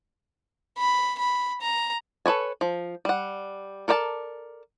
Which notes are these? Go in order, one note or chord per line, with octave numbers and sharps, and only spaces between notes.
B5
B5
A#5
A4 B4 C#5 G#5
F3
G3 F#5
A4 A#4 D5 G5 A5